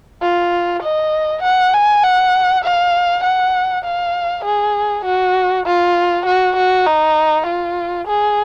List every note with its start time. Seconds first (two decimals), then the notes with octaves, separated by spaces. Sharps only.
0.22 F4
0.83 D#5
1.43 F#5
1.74 G#5
2.03 F#5
2.64 F5
3.24 F#5
3.85 F5
4.45 G#4
5.05 F#4
5.66 F4
6.26 F#4
6.56 F#4
6.86 D#4
7.46 F4
8.08 G#4